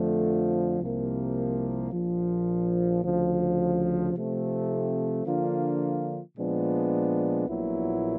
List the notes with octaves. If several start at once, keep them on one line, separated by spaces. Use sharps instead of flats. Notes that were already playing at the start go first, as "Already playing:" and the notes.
Already playing: F2 D3 F3 A3
C2 C3 F3 A#3
A#1 A#2 F3
D2 C#3 F3
C3 F3 A3 C4
D3 F3 A#3 D4 F4
A#2 F3 G#3 B3 D4
A#1 A#2 F#3 B3 E4